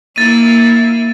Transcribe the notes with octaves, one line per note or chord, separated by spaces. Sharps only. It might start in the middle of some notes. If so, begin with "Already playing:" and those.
A#3 E4 A6 D#7